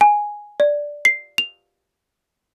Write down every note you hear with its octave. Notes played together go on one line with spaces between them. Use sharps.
G#5
D5
C7
F7